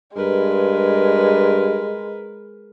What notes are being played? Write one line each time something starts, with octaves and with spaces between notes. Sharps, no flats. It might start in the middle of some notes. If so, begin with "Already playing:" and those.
G2 G#3 A#4 B4